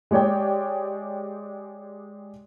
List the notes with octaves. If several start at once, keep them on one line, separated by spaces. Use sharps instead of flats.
G#3 G4 C#5 D5 G5